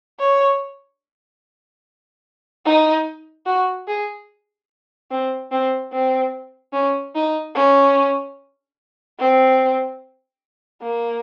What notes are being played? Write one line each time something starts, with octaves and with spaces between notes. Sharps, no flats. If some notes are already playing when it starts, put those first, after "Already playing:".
C#5
D#4
F#4
G#4
C4
C4
C4
C#4
D#4
C#4
C4
A#3